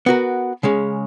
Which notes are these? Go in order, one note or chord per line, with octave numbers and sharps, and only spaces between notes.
B3 F#4 A#4
C#3 G#3 C#4